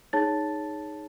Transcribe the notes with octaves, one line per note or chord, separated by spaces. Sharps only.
D#4 G#4 C#5 A5 A6